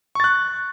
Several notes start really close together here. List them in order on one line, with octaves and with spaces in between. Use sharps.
C#6 A6 F#6